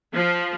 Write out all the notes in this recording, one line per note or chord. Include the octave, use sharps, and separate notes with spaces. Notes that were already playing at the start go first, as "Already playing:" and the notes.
F3